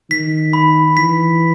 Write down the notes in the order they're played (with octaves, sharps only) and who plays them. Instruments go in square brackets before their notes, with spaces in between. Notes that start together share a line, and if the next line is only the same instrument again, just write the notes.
[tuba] D#3 [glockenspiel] B6
[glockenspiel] B5
[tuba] E3 [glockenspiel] B6